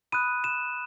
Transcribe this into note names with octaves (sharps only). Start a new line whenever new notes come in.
B5 D#6 F#6 D#7
E7